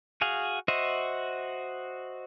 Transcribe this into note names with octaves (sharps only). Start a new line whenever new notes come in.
F#4 G#4 F5
F#4 C5 D#5 E5